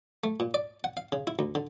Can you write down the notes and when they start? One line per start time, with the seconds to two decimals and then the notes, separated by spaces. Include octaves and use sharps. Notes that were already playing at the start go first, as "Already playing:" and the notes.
0.24 A3
0.40 A#2
0.54 D5
0.84 F#5
0.97 F5
1.12 C#3
1.27 E4
1.39 D2
1.55 D3